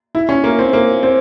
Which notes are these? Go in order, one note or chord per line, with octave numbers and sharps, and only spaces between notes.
E4
C#4
A#3
C4
A#3
C4